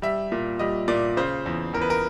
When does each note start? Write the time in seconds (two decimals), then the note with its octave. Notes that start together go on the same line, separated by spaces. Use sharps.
0.02 G3 E5
0.32 A#2
0.59 G3 D#5
0.88 A#2 D5
1.17 C#3 C5
1.46 E2
1.73 E2 A#4
1.81 B4
1.90 A#4